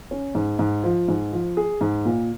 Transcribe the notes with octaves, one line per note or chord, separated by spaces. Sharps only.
C#4
G#2
G#2
F3
G#2
F3
G#4
G#2
A#2